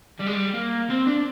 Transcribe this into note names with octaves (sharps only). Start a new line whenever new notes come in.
G3
G#3
G3
A#3
C4
D4